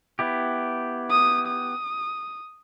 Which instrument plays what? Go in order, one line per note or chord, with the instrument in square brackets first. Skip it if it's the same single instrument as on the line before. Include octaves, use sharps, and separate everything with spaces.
[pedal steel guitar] B3 E4 G4
[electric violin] D#6
D#6